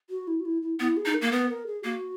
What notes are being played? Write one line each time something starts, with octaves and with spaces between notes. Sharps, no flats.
F#4
E4
F#4
E4
E4
B3 E4
G#4
D#4
A#4
A#3
B3 B4
A#4
G#4
A#3 F#4